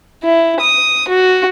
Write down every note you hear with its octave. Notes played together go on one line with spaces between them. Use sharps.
E4
D#6
F#4